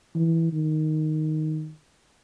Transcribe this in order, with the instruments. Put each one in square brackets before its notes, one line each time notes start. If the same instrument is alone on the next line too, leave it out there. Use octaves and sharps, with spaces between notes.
[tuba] E3
D#3